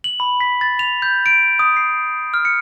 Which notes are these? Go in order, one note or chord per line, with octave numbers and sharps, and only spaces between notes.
F#7
B5
B6
A6
F7
G6
D7
D#6
C7
F6
C#7